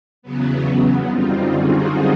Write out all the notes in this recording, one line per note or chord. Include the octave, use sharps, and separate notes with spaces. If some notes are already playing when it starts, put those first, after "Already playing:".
E2 C#3 F#3 B3
F#2 D3 G3 C4 D#4 F4
F#4 G#4